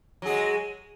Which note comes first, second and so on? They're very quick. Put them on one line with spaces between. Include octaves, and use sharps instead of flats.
F#3 G#4 G#3